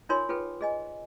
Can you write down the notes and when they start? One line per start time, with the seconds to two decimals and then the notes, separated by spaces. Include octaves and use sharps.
0.09 D#4 F4 A#4 C#5 G#5 C6
0.29 F4 G#4 A4 B4 G5
0.61 G#4 D#5 G#5